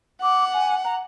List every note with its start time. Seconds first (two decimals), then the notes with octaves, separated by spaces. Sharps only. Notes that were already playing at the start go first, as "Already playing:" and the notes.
0.22 F#5 D6
0.54 G#5
0.84 A#5